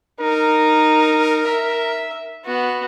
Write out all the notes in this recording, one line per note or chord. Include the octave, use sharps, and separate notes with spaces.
D#4 A#4
E5
B3 F#4